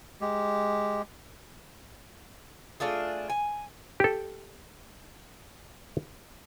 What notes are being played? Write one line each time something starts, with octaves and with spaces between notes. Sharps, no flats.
G#3 G4
A3 D4 F4 G#4
G#5
G4 A4